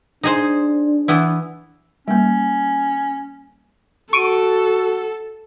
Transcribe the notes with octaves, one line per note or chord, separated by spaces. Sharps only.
D4 D#4 G#4 C5
E3 B3 E4
G3 A#3 C#4
F#4 A4 C#6 D7 D#7